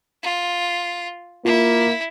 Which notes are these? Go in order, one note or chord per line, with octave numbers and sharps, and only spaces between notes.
F4
A#3 E4 F4